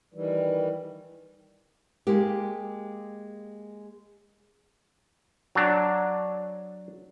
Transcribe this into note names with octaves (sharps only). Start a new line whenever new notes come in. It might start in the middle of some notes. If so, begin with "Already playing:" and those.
D#3 E3 G3
G#3 A#3 G4
F#3 D4